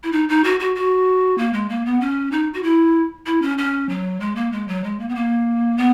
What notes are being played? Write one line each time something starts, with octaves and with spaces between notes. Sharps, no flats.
E4
D#4
D#4
F#4
F#4
F#4
A#3
G#3
A#3
B3
C#4
D#4
F#4
E4
E4
C#4
C#4
F#3
G#3
A#3
G#3
F#3
G#3
A#3
B3
A#3
B3